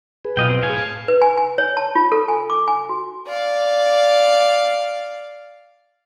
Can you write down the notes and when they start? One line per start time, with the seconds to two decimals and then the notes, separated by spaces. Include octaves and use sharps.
0.25 G#4 B4
0.37 B1 F4 D#5 G5
0.49 C4
0.63 A2 F5 G#5
0.77 A5
1.08 B4
1.22 G#5
1.37 G#5
1.58 C#5
1.77 A5
1.95 F4
2.12 A4
2.28 G#5
2.50 D6
2.68 G#5
2.89 F#4
3.28 D5 F5